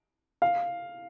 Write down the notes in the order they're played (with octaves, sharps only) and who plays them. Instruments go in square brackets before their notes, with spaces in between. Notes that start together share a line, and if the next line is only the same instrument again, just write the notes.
[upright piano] F5